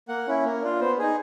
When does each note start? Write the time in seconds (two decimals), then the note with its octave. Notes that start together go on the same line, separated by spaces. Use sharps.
0.08 A#3 F#5
0.27 C#4 E4
0.45 A#3
0.62 D4 F4
0.80 B3 C5
0.99 D#4 G#4